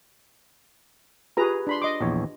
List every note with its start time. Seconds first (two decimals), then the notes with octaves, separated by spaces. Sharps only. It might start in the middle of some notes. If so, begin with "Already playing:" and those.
1.37 F4 G4 G#4 B4 A#5
1.67 D4 B5 C6
1.82 D#5 C6 D6
2.01 A#1 E2 C#5